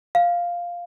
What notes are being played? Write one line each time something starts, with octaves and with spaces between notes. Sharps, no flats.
F5